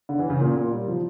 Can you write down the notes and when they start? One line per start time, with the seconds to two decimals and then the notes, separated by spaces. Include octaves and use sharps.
0.09 D3
0.19 E3
0.30 C#3
0.40 A#2
0.56 A#2
0.71 G3
0.88 F3